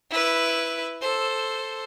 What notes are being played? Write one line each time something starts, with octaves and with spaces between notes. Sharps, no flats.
E4 B4
A4 C5